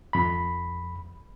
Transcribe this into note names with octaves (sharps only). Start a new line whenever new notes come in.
F2 B5